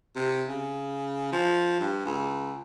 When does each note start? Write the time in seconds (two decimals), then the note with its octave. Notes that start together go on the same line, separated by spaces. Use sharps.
0.16 C3
0.49 C#3
1.32 F3
1.80 G2
2.05 C#2